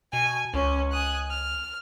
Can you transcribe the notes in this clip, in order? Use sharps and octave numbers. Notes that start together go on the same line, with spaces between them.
B2 G#5
C#2 C#4
G#5 D#6 F#6
F6